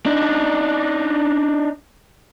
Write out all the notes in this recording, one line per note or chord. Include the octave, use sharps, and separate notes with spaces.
D4 D#4